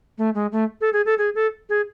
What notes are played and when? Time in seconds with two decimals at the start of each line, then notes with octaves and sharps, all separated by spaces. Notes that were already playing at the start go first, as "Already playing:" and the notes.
0.18 A3
0.35 G#3
0.52 A3
0.81 A4
0.93 G#4
1.06 A4
1.18 G#4
1.35 A4
1.69 G#4